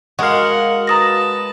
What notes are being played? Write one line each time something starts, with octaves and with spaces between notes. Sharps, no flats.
G#3 F#4 A#4 F5 F#5
B4 A5 A#5 D#6 A#6